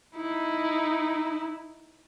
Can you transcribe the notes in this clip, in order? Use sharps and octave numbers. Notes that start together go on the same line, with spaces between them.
D#4 E4